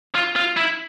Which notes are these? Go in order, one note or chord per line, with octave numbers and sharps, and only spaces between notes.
F4
F4
E4